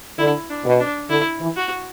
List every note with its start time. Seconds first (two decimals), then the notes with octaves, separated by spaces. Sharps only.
0.18 D3 E4
0.50 D4
0.65 B2
0.80 D4
1.10 D3 E4
1.40 E3
1.56 F#4